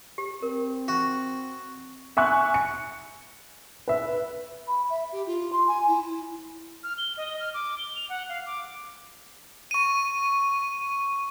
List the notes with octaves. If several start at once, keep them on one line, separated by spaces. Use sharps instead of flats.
G4
C4 A#4
F#4
E5 G#5 C#6 F#6
C#7
B4 E5
B5
E5
G4
F4
C6
G#5
E4
F6
G7
D#5
F6
D6
G7
F7
F#5
F5
D6
C#6 D#7